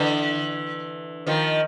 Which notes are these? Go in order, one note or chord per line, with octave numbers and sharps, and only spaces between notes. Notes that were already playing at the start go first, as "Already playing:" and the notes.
Already playing: D3 E3
D#3 F3